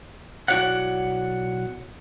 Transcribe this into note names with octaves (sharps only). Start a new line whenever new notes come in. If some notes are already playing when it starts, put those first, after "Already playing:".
B1 E4 F#4 C#5 D5 F#5